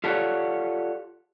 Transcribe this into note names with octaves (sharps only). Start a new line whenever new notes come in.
F4 G4 A4 C#5 D5 F#5